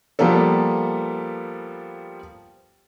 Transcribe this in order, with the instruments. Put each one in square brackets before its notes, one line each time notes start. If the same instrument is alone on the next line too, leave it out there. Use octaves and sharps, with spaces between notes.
[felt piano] F3 G3 A#3 B3 A4